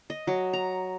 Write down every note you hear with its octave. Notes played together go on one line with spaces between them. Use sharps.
D#5
F#3
A#5